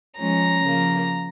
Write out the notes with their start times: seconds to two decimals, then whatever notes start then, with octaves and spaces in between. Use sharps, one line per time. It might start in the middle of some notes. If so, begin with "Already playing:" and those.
0.19 F3 G#3 C#4 A#5
0.62 C#3 F3 A#3